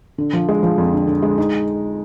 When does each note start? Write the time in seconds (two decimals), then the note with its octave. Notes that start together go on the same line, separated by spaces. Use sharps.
0.18 D3
0.33 F3
0.49 G#3
0.63 F3
0.78 F2
0.93 D3
1.07 D3
1.22 G#3
1.38 D#4